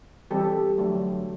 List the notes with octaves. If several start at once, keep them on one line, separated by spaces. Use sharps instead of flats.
E3 G3 C4 G4 A4
D3 F#3 A3